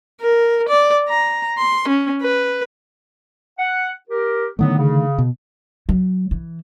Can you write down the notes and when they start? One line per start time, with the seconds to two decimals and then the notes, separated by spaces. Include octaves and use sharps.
0.21 A#4
0.69 D5
1.08 A#5
1.58 C6
1.88 C#4
2.22 B4
3.58 F#5
4.09 G4 A#4
4.59 A2 D3 D#3 F#3 A3 B3
4.78 C#3
5.18 B2
5.89 F#3
6.31 E3